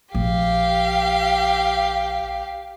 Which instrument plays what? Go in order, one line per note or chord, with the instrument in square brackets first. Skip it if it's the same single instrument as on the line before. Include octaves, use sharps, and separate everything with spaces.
[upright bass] A#1 [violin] G4 F5